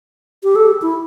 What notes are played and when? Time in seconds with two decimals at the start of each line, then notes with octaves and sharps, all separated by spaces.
0.43 G4
0.56 A4
0.67 G4
0.82 E4